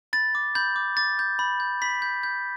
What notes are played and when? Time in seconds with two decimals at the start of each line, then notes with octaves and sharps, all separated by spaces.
0.13 B5 A6
0.35 D6
0.55 B5 G6
0.76 D6
0.97 D6 A6
1.19 G6
1.39 B5
1.60 G6
1.82 B5 B6
2.02 G6
2.23 G6